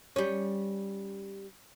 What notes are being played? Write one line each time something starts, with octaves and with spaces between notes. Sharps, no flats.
G3 C#4